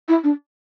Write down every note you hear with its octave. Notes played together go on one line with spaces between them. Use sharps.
E4
D4